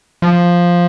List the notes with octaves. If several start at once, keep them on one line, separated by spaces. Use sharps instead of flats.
F3